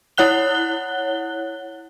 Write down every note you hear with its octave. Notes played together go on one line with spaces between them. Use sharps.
E4 C#5 F#5 F#6 G7